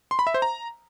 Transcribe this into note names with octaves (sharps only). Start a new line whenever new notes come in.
C6
B5
E5
C5
A#5